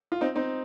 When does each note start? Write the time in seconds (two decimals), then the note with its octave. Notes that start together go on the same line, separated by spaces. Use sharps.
0.12 F4
0.21 C4 D#4
0.36 C4 D#4